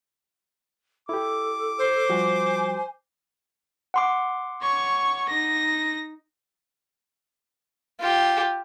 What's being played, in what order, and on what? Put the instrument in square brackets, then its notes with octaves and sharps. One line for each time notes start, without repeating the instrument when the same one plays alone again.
[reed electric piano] E4 G4 [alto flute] A4 [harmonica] D6
[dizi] C5
[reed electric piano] F3 G3 F#4 [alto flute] G#5
[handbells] F#5 C6 D6
[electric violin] C#5 C#6
D#4 A#6
[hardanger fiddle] F4 G4